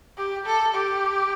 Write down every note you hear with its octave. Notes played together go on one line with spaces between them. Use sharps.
G4
A4
G4